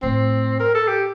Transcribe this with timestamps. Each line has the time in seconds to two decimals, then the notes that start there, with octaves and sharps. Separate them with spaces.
0.03 A2 C4
0.60 A#4
0.75 A4
0.88 G4